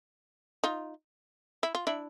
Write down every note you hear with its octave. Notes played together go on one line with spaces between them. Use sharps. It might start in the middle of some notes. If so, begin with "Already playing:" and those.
D#4 F4
E4
F4
D4 E4